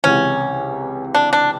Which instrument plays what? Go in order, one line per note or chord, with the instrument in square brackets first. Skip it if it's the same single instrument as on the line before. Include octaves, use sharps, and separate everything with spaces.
[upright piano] C#2 C3 E3 [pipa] C#4
[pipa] D4
D4